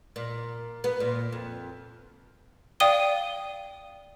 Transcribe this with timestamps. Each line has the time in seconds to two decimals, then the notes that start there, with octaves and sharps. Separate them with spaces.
0.16 A#2
0.84 B3
1.00 A#2
1.33 F2
2.80 D5 F5 G5 D#6 D#7 G7